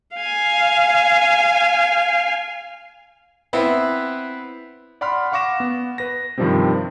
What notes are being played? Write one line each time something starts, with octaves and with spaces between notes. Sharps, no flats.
F5 G#5
B3 C4 E4 B4
D5 F#5 B5 C6 F6
F5 F#5 C#6 D6 A#6 E7
B3
B4 A#6
G2 C3 D#3 F3 G3 C4